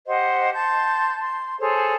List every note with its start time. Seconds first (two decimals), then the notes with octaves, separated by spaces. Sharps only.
0.07 G4 C5 D#5 F#5
0.53 A5 C6 G6
1.19 C6
1.59 G#4 A4 C5 C#5